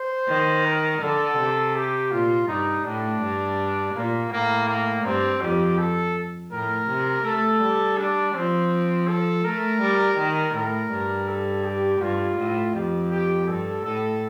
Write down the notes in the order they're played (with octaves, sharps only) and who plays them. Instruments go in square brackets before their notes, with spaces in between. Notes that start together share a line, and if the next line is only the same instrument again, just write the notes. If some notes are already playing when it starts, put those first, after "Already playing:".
Already playing: [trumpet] C5
[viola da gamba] D#3
[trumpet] A#4
[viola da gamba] D3 [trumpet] A4
[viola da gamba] C3
[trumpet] G4
[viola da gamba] A#2 [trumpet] F4
[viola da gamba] G2 [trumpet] D#4
[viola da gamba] A2 [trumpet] D4
[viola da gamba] G2
[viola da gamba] A#2 [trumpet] A#3
[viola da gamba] A2 [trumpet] A#3
[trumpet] A#3
[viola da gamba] G2 [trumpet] C4
[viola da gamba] F2 [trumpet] G4
[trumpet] A4
[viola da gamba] A2 [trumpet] A#4
[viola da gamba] C3
[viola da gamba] A3 [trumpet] A4
[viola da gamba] G3
[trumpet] D4
[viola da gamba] F3 [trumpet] C4
[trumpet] A4
[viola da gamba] A3 [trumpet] A#4
[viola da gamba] G3
D#3
[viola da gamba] A2 [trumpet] A#4
[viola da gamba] G2
[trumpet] A4
G4
[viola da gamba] G2 [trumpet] F4
[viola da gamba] A2
[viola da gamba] F2 [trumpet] G4
[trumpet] G4
[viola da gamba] G2 [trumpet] A4
[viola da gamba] A2 [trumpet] A4